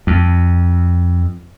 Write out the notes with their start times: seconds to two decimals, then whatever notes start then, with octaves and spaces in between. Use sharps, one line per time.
0.07 F2